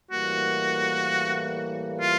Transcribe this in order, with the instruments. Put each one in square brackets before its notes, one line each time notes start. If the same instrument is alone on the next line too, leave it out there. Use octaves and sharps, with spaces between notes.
[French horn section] A2 E3 G3 A#3 [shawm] F#4
[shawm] F4